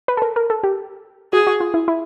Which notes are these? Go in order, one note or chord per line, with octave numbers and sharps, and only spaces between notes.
B4
A4
A#4
A#4
A4
G4
F#4 G#4
F#4
F4
E4
E4